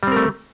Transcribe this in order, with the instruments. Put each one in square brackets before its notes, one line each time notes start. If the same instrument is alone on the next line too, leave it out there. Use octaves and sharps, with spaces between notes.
[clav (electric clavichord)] G3
C4
A#4
A3